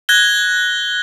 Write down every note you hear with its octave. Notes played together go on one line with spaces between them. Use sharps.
F#6 G#6 A#6 G7